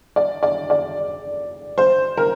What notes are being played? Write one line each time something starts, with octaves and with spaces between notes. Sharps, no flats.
D5
D5
D5
C5
A#4